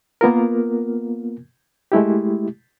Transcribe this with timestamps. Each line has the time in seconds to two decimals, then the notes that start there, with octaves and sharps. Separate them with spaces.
0.21 A#3 B3 F4 A#4
1.92 G#3 A3 E4 G4